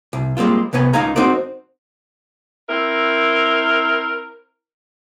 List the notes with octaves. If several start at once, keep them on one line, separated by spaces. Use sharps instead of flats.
C2
G3 G#3 A#3 C4 F4
C2 C3 B3 C#5 G#5
C#2 D#4 D#5 F5 G#5 A#5
C4 D#4 F#4 A#4 C5 D5
C4 E4 A#4